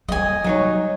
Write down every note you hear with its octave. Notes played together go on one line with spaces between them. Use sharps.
G3 D#5 G#5
F#3 D#4 C#5